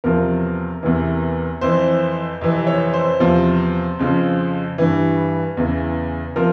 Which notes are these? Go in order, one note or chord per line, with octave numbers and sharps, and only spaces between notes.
E2 C3 F3 A#4
E2 C3 E3
F2 E3 C5
F2 C3 E3
C#5
C5
E2 C3 F3
F2 C#3 F3
G2 E3
E2 C#3 E3
C3 F3 A#4